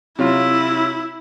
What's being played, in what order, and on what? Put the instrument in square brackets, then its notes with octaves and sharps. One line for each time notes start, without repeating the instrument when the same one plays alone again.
[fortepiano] C3 F#3 F4 [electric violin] E4